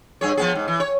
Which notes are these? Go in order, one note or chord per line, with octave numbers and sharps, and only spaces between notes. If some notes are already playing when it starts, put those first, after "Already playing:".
G2 G#4 C#5
F3 B3 G#4
G#2
E3
C#5